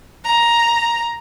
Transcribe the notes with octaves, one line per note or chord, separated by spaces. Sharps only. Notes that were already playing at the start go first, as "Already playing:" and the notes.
A#5